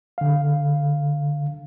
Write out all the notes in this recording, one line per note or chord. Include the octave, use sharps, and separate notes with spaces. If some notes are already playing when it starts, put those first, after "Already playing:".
D3 F5